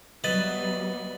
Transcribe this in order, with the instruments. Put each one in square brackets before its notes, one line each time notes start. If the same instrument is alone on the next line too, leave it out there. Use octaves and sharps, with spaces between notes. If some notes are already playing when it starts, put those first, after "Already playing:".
[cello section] F#3 G3 B3 [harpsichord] E4 B4 D#5 [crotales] A6 F#7